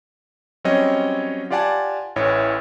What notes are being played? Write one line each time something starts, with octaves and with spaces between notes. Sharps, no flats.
F#3 G3 C4 C#4 C#5 D#5
F4 G4 D5 F#5 G#5 A5
A1 A2 E3 C#5